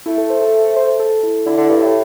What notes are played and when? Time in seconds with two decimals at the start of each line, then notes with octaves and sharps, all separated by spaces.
0.06 A3 E4
0.18 A4
0.30 C5
0.42 A4
0.76 C5
1.00 A4
1.23 E4
1.46 D3 E4
1.57 D3 A4
1.69 G2 G4
1.81 A2 A4